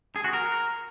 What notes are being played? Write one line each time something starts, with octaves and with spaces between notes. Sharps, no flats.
G#4
F#4
A#4